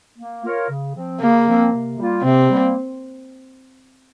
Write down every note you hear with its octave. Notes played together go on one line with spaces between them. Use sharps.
A#3
F4 A#4 C#5
C#3
F3 C4
C#3 A#3
F3 C4
C3
G3 A#3 F4
C3 C4
G3 A#3